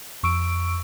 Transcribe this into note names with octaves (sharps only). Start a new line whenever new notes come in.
F2 C#6 E6 D7